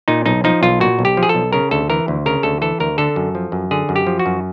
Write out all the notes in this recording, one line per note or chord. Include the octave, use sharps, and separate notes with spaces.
A#2 D#4
B1 D#4
F3 D#4
B1 F4
A#2 F#4
B1
G4
F3
G#4
A4
B1
C#3 A#4
D2 A4
E3 A#4
D2
C#3 A#4
D2 A4
E3 A4
D2 A#4
D3 A4
F#2
F3
F#2
D3 G#4
F#2
G4
F3
F#4
F#2